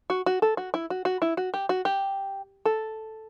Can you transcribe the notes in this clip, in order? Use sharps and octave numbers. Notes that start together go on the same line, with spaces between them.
F#4
F#4
A4
F#4
E4
F#4
F#4
E4
F#4
G4
F#4
G4
A4